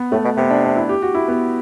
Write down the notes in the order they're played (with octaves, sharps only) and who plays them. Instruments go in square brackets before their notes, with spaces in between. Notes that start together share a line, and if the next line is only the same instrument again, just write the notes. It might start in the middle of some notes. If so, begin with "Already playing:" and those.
Already playing: [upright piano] B3
[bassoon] A2 [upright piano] A3
[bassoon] B2
[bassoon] C3 [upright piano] B3
[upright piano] D4
D4
E4
G4
F#4
E4
B3